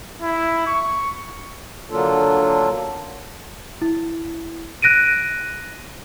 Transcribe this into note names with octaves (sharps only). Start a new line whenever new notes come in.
E4
C#6
D3 F#3 A#3 D4 F4 A4
E4
F#6 A#6 D7 D#7